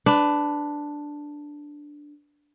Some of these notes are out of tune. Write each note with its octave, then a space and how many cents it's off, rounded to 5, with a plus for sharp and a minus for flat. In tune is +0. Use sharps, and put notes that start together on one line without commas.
D4 +0 B4 +15